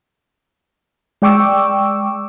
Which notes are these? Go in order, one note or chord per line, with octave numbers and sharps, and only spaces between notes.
G#3 D5 G5 C#6 D6 E6